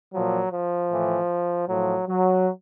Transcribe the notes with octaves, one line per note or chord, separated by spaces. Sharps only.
A#2 F3 F#3
F3
A2 E3
A2 F3 F#3
F#3